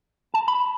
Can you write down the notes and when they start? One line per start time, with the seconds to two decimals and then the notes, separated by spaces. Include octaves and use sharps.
0.34 A5
0.48 B5